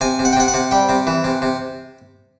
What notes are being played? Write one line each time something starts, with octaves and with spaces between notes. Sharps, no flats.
C3 G#5
C3
F#5
G5
C3 F#5
F#5
C3
G3 G5
C3
E3
C3
C3